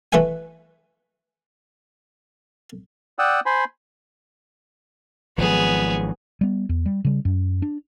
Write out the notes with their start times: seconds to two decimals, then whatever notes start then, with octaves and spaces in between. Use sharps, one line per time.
0.13 E3 A3 B4 E5 G#5
3.19 D5 F#5 G5 D#6 E6
3.46 C5 G#5 B5 C6
5.38 G#1 F3 F#3 B3 G#4
6.41 G3 B3
6.69 E2
6.86 G3
7.05 C#3 G3
7.25 F#2
7.62 D4